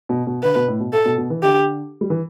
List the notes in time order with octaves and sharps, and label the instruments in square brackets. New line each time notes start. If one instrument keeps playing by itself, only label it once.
[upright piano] B2
B2
[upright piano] D3 [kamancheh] B4
[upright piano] B2
A2
B2
[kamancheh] A4
[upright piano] B2
B2
E3
[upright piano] D3 [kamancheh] G4
[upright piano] G3
E3